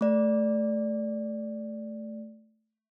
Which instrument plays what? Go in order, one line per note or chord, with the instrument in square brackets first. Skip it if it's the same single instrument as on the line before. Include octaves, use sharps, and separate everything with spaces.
[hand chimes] A3 D5